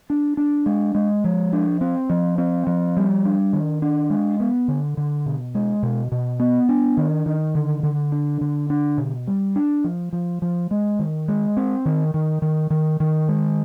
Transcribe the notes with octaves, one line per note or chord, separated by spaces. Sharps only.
D4
D4
G#3
G#3
F3
D4
C4
F3
C4
F3
G3
D4
D#3
D4
G#3
B3
D3
D3
B2
G#3
B2
B2
B3
D4
D#3
D#3
D3
D3
D4
D3
D4
B2
G3
D4
F3
F3
F3
G#3
D#3
G#3
C4
D#3
D#3
D#3
D#3
D#3
G#3